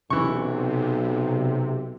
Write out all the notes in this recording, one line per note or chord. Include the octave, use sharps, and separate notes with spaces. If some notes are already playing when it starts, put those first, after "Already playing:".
B1 C3 E3 C#6